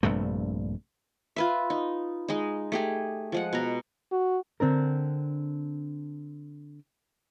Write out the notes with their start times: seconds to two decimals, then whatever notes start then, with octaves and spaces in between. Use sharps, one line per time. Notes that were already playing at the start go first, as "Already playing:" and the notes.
0.03 A#1 G2 C3 A3
1.36 F4 B4 E5
1.70 D#4
2.28 G#3 D#4
2.72 A3 G4 G#4
3.32 F3 G#3 F#5
3.53 B2 A#5
4.12 F#4
4.60 D3 C4 D4 A#4